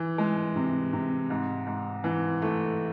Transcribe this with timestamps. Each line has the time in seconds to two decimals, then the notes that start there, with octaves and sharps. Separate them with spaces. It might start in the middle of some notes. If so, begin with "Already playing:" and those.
Already playing: E3
0.18 G#3
0.56 C3
0.93 C3
1.30 G#2
1.67 G#2
2.04 E3
2.42 A3